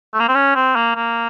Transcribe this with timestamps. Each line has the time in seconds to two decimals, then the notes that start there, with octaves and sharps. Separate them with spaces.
0.14 A3
0.20 A#3
0.28 C4
0.35 C#4
0.55 C4
0.75 A#3
0.96 A#3